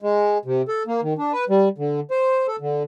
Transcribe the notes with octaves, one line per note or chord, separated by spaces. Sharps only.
G#3
C3
A4
A#3
D#3
D4
B4
G3
D3
C5
A4
D3